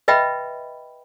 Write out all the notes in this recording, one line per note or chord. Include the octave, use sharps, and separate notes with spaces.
B4 D#5 E5 G5 B5